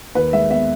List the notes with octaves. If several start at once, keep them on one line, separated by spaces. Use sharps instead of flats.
D#2 B4
G#3 E5
B3 E5